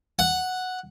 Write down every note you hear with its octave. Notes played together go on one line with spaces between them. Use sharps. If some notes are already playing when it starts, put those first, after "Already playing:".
F#5